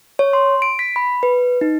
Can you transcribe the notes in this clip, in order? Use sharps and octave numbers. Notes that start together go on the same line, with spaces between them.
C#5
C6
D7
B6
B5
B4
D#4